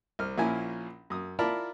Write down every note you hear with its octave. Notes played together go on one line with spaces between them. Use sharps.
C2 F6
A#1 A#2 A#3 C#4 E4 G#5
F#2 D#6
E4 F4 A#4 D5 A5 B5